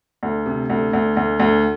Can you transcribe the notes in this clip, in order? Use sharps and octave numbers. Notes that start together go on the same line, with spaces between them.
D2
C3
D2
D2
D2
D2